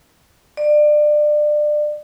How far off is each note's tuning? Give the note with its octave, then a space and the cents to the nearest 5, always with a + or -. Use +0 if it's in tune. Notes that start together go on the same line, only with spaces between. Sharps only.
D5 +25